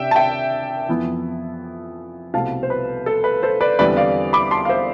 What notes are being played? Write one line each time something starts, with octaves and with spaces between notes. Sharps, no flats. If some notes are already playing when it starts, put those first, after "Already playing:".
Already playing: C3 D4 E5 G5
A5
E5 G5
F2 E3 B3 E4
C2 B2 A3 C4 F5 A5
C5
B4
A4
B4
A4 C5
B4 D5
E2 D3 G3 C4 E4 B4 D5
D5 F5
B5 D6
A5 C6
F5
C5 E5